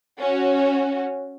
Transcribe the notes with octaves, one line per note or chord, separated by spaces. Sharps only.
C#4 F#4